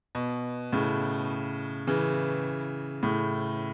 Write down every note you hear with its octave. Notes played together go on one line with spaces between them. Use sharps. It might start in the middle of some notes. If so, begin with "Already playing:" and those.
B2
A2 C#3
C#3 E3
A2 C#3